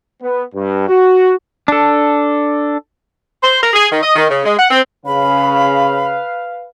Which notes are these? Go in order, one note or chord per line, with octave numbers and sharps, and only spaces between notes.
B3
G2
F#4
D4 A4
C5
A#4
G#4
D#3
D#5
D#3
C#3
G#3
F#5
C4
C#3 B4 F5 B5